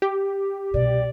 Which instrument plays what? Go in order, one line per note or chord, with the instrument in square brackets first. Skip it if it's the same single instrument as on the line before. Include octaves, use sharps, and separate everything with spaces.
[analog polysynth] G4
[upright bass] C2 B2 [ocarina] D5